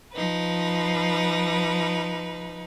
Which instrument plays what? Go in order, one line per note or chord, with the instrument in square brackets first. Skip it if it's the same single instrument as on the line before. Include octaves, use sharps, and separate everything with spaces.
[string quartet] F3 D#4 B4